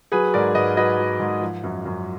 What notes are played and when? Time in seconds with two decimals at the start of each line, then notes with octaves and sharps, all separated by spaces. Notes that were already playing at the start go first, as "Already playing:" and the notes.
0.12 F#3 G#4 B4
0.34 G#2 A#4 D5
0.55 G#2 B4 D#5
0.76 F#3 B4 D#5
0.99 F#3
1.20 G#2
1.41 F3
1.63 F#2
1.85 F#2